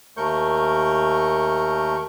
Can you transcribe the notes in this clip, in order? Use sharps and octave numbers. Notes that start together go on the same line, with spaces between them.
D#2 A3 A#4 C#6 G6